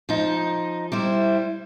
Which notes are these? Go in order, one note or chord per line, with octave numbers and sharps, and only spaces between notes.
F3 D#4
G3 E4 C5